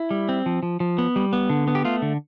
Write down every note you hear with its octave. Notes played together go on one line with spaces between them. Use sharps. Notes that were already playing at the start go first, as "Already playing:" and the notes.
Already playing: E4
G3
C4
F3
F3
F3
B3
G3
B3
D3
B3
G4
A3 F4
D3